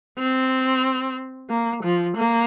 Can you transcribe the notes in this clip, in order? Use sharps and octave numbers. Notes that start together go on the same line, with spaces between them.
C4
A#3
F3
A#3